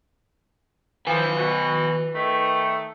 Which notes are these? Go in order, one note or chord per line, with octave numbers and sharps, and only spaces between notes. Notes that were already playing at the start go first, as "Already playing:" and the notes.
F3 B4 G#5
B2 F#4
D#3 A3